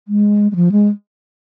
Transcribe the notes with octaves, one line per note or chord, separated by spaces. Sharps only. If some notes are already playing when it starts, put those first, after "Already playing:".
G#3
G#3
F3
G#3